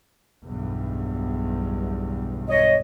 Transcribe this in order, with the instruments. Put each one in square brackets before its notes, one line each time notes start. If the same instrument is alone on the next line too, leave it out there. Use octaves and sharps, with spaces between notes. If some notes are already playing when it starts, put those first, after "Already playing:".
[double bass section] B1 E2 G2
[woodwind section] C#5 D#5